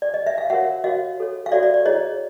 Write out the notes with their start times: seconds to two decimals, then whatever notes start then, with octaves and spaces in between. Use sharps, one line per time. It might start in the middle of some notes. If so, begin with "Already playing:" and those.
0.02 D5
0.14 D#5
0.26 E5
0.38 F5
0.50 F#4 A#4 C#5 E5 F#5
0.84 F#4 A#4 C#5 D#5 F5
1.18 F#4 A4 C#5
1.46 F5
1.52 F#4 A4 C#5 D5 E5
1.63 D5
1.74 D5
1.85 E4 G#4 C#5 D#5